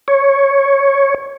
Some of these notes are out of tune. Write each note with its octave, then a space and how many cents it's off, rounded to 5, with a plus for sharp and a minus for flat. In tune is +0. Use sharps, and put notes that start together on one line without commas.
C#5 -5